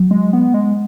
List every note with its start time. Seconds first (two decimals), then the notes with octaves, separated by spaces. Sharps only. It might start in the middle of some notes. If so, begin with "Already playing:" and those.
Already playing: F#3
0.11 G#3
0.33 B3
0.54 G#3